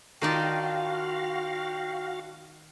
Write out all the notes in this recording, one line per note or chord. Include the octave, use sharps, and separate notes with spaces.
D#3 D4 D#4 F4 F#4 D5 F5 G5